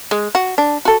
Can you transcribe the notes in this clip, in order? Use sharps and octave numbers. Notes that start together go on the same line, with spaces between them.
G#3
F#4
D4
F#4 A4